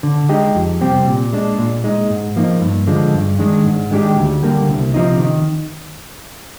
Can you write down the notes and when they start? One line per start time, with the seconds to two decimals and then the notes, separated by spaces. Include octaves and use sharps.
0.03 D3
0.29 G#3 D#4 G4
0.55 F2
0.81 C3 G3 C4 G4
1.07 A#2
1.33 G#3 D4
1.59 A#2
1.84 G#3 D#4
2.10 G#2
2.36 F3 A#3 D#4
2.61 G2
2.87 D3 F3 G#3
3.14 G2
3.39 D#3 G#3 D4
3.65 G#2
3.91 D#3 G#3 D4 G4
4.17 D2
4.43 D3 G3 A#3
4.69 C2
4.94 C3 F3 C4 D#4
5.20 D#3